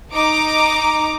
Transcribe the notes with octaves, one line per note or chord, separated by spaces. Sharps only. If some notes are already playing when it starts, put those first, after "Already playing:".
D#4 A#5 D6